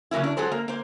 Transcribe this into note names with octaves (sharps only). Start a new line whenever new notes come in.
C#3 F#3 A#3 C#4 E4
D4
F#3 G#3 G#4 A4 C5
A#3
A#3 C5